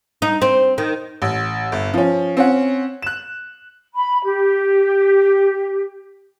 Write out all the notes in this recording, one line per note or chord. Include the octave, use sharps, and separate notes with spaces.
D#4
C4
D#3
A1
G1
F3 C#4
C4 C#4 F#5
F#6 E7
B5
G4